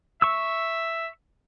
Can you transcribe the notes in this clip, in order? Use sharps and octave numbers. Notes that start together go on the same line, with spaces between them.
E5 C#6 E6